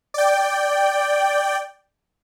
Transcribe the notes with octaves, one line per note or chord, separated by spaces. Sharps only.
D5 G5